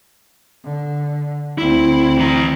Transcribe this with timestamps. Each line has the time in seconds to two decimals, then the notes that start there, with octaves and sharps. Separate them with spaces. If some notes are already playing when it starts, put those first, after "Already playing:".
0.64 D3
1.58 D2 C4 E4
2.18 E3 A#5